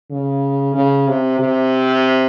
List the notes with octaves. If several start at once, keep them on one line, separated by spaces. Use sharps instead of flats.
C#3
C#3
C3
C3